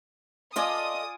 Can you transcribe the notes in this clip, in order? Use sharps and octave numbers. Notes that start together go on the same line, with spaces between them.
F4 A4 D5 D#5 F5 G#5 D#6